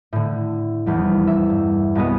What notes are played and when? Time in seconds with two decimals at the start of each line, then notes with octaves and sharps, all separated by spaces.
0.13 A2 D3
0.86 F1 E2 G3
1.27 E5
1.50 G2
1.95 C2 B2 G#3 B3 D#6